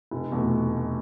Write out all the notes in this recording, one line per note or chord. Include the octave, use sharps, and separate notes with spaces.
F1
E2 B2 A3